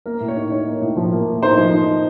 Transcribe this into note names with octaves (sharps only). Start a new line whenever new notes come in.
A#3 A#4
A2
C#5
D#4
D#4 C#5
A#3
A2
F3
A#3
A2
D#4 C5
F3
D#4